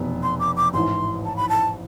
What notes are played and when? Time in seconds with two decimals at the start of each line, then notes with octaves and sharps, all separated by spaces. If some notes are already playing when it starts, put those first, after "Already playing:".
Already playing: F1 E2 B2 B3
0.23 C6
0.40 D6
0.57 D6
0.74 A1 G#2 E3 C6
1.25 A5
1.36 B5
1.49 A5